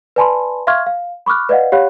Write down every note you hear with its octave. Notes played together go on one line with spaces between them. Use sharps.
B4 D5 G#5 A5 B5 C6
E5 F5 C6 C#6 F6 G#6
F5
B5 C#6 D6 F6 F#6
B4 D5 D#5 F5 F#5
G4 C#5 F5 F#5 B5 F#6